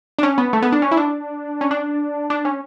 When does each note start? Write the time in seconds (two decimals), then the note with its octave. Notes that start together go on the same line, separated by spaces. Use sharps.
0.19 D4
0.23 C#4
0.38 B3
0.53 A3
0.62 B3
0.72 D4
0.82 C#4
0.91 E4
0.97 D4
1.61 C#4
1.71 D4
2.30 D4
2.45 C#4